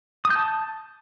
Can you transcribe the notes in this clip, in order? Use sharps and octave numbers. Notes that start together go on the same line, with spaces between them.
D#6
G6
A5